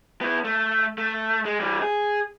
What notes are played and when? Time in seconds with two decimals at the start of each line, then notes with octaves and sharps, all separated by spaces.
0.21 B3 E4
0.45 A3
0.98 A3
1.45 G#3
1.60 E3 G3
1.82 G#4